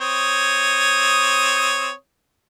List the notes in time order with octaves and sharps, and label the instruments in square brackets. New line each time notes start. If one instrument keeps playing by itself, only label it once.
[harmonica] C4 C#5 D#6